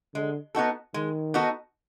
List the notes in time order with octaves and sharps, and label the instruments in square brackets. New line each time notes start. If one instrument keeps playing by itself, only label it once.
[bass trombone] D3 [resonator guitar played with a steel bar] G#3
[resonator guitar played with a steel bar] B3 D#4 F#4 A4
[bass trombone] D#3 [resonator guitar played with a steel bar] G#3
[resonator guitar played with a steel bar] B3 D#4 F#4 A4